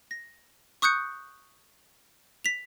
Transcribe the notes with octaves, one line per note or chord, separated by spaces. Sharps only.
A#6
C#6 D#6 F#6 G6 C#7
B6 F7